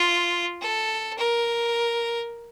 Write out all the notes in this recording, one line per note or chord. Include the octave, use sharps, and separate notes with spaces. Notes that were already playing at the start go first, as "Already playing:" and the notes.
Already playing: F4
A4
A#4